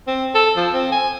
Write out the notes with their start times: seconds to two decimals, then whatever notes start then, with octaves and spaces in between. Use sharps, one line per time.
0.07 C4
0.35 A4
0.56 F3
0.73 C4
0.92 G#5